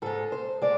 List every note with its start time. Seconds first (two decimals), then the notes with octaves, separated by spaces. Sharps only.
0.02 G#2 G#3 A4
0.32 C5
0.62 G#3 D5